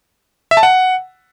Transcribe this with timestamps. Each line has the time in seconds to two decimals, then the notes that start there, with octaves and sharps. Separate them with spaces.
0.51 E5
0.57 A5
0.63 F#5